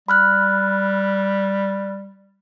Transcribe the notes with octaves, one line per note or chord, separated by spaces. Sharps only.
G3 B5 F6 F#6